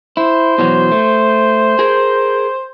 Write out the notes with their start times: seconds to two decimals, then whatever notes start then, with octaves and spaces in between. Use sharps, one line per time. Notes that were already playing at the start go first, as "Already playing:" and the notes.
0.17 E4 C5
0.58 B2 E3 F#3
0.92 A3
1.79 G#4 A#4